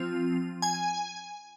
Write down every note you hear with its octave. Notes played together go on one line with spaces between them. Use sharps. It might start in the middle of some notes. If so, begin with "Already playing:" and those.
Already playing: F3 C4 F4
G#5